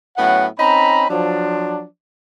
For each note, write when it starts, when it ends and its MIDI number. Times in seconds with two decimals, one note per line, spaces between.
0.17 0.47 45
0.17 0.47 54
0.17 0.47 59
0.17 0.47 61
0.17 0.47 78
0.58 1.06 60
0.58 1.06 61
0.58 1.06 63
0.58 1.06 82
0.58 1.06 83
1.09 1.85 53
1.09 1.85 54
1.09 1.85 62